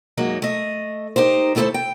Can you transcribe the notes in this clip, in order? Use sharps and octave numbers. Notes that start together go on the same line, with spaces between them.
F#2 F#3 G#3 A#3 D#4
A3 D#5
D#4 G4 A#4 C5
D#2 A3 E4 G#4 A4 C5
G5